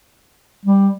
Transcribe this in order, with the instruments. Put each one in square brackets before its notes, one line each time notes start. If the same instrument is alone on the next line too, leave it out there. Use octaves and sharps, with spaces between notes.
[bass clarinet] G3